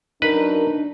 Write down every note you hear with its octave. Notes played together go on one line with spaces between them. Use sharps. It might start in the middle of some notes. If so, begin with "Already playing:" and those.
F#2 D4 D#4 A#4 B4